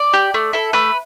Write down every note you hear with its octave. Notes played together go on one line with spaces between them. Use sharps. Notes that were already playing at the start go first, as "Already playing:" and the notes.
Already playing: D5
G4
A3
E4 A4
A3 B4